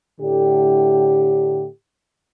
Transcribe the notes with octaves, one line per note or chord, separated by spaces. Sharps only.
A2 D3 G4